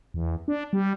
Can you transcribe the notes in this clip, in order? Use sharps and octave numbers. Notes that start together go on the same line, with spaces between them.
E2
D4
G3